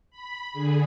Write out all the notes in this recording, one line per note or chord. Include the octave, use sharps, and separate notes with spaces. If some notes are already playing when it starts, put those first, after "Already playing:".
B5
D3 G#4